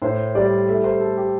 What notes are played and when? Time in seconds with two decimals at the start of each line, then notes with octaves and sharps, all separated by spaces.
0.02 A2 C5
0.35 G3 D5
0.68 A3 E5
0.84 C5
1.00 A3 A4
1.17 G4